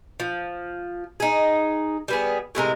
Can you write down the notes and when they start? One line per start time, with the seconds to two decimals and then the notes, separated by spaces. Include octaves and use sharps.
0.20 F3
1.20 D#4 G#4
2.08 G3 B3 G#4
2.55 A2 C3 G#3 A#4